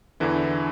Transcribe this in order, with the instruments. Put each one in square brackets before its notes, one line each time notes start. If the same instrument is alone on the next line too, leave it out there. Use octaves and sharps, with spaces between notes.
[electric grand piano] E2 D3 E3 E4